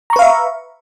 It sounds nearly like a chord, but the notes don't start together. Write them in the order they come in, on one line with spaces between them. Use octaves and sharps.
A#5 C#6 B4 F5 E5